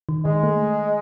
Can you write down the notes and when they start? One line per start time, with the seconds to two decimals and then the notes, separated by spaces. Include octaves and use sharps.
0.09 D#3
0.25 D#3 G#3
0.43 A3